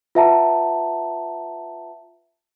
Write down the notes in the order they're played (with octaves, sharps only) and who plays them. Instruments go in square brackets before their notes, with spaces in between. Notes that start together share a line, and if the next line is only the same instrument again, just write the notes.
[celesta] F4 B4 E5 F#5 A5 A#5